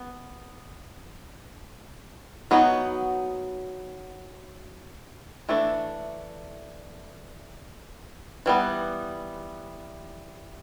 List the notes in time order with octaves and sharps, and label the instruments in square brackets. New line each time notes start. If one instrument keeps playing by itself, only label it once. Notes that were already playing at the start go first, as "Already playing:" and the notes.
Already playing: [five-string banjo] B3
F#3 B3 D#4 F#4
E3 A3 D4
E3 G3 B3